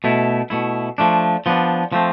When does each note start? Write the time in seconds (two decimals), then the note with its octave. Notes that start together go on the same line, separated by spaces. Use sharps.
0.04 B2 A3 E4
0.50 B2 A3 E4
0.98 F3 A3 D4
1.46 F3 B3 D4
1.92 F3 A3 C4